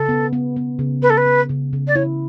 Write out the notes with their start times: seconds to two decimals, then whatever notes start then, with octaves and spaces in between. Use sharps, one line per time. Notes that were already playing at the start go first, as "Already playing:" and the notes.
Already playing: C#3 A4
0.09 B3
0.33 B3
0.56 B3
0.79 C#3
1.02 B3 B4
1.10 A4
1.17 B4
1.26 B3
1.49 C#3
1.73 C#3
1.88 D5
1.95 E4 C#5